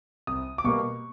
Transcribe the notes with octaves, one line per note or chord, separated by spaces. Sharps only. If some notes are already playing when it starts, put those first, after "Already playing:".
C2 D#6
D6
B2 G3 A#3 C#6